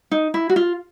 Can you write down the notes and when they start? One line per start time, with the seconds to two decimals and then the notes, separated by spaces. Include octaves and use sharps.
0.11 D#4
0.34 E4
0.50 F#4
0.56 F4